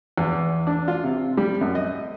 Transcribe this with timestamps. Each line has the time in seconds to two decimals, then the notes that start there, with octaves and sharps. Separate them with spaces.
0.18 E2
0.67 D4
0.88 F4
1.04 C3
1.37 G3
1.61 F#2
1.75 D#5